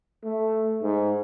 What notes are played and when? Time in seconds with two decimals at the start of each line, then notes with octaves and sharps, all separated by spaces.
0.24 A3
0.82 G#2